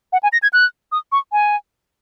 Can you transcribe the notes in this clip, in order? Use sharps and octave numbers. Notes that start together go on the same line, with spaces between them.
F#5
G#5
A#6
G#6
F#6
D#6
C#6
G#5